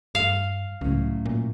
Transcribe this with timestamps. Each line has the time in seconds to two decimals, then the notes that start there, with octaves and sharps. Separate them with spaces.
0.15 G2 F5
0.81 C#2 A2 F#3 C#4
1.26 A#2